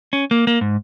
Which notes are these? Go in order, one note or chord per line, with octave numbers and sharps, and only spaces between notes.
C#4
A#3
A#3
G#2